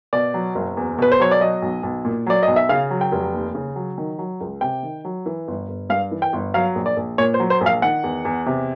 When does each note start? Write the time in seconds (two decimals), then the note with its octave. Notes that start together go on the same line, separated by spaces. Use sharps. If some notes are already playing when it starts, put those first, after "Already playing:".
0.13 B2 D5
0.34 F#3
0.55 F#1
0.77 E2
0.98 B2 B4
1.12 C5
1.20 F#3 C#5
1.31 D5
1.41 F#3 D#5
1.62 B1
1.83 B1
2.05 A#2
2.26 F#3 D5
2.43 B1 D#5
2.56 E5
2.69 C#3 F5
2.91 F#3
3.01 G5
3.12 F1
3.34 D#2
3.55 C#3
3.76 F#3
3.98 D#3
4.18 F#3
4.41 C#2
4.61 C3 G5
4.83 D#3
5.05 F#3
5.26 E3
5.48 G1
5.68 G1
5.90 G2 F5
6.11 E3
6.22 G5
6.33 G1
6.54 F#3 F5
6.75 A#1
6.86 D5
6.97 A#1
7.18 A#2 C#5
7.34 C5
7.40 F#3
7.50 C5
7.61 A#1
7.66 F5
7.82 D#3 F#5
8.04 E2
8.25 E2
8.46 C3